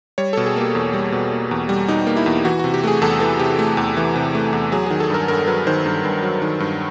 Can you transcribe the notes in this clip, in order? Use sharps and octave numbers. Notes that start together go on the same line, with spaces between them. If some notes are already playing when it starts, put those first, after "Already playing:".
G3 C#5
B2 A4
G#4
A#3 G4
E2
G3
B2
A#3
E2
G3
B2 D#4
A#3
E4
E2
E3 F#4
C3 F#4
G4
A3 G#4
E2 A4
E3 A4
C3 G4
A3
E2
E3
C3
A3
E2
F#3 G#4
D#3 G#4
A4
G2 A#4
G2 A#4
F#3 B4
D#3 C5
G2
G2
F#3
D#3
G2